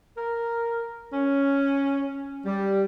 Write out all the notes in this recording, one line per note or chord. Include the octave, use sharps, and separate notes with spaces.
A#4
C#4
G3